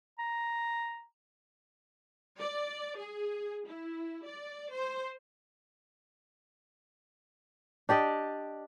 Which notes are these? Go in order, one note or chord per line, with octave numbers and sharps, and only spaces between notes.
A#5
D5
G#4
E4
D5
C5
D4 G4 D5 D#5